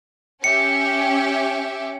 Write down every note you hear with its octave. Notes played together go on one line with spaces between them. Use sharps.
C#4 G4 E5 C#7